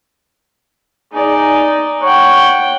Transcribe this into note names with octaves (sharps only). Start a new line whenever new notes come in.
D#4 G#4 D5
C#5 F#5 G5